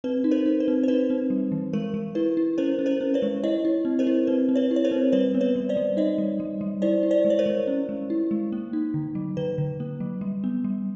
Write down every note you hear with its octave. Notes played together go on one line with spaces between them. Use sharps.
C4 B4
D#4
A#4 C5
D#4
B4
C4
C5
D#4 B4
C4
G3
E3
G#3 A#4
G#3
E4 B4
E4
C#4 A#4 C5
C#4
A#4 C5
C#4
B4 C#5
G#3
E4 C#5 D#5
E4
C4
A#4 C5
E4
C4 B4
C4
B4 C#5
E4
C#5
A#4 C5
C4
G3 B4 C#5
B3
B4 C#5
G3
C5 D5
G3
D#4 C#5 D#5
G3
G3
G3
E4 C5 D5
E4
C5 D5
G#3
C#5
A#4 C5
G#3
C#4
G#3
E4
G#3
A#3
D#4
D3
F#3
D3 B4
D3
A#3
F#3
G3
B3
G3